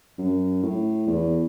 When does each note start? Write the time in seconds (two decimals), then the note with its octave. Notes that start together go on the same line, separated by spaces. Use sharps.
0.19 F#2
0.63 A2
1.07 E2